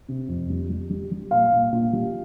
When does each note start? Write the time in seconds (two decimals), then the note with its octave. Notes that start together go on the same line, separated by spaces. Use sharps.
0.09 C3
0.28 F2
0.50 G3
0.70 G3
0.90 G3
1.12 G3
1.31 A#2 F5
1.52 A#2
1.72 A#2
1.93 G3